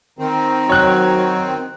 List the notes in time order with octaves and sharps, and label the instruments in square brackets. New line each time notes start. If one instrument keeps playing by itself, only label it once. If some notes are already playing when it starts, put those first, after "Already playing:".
[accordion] D#3 C4 [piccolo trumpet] A#5
[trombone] F#3 [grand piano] C#5 F#6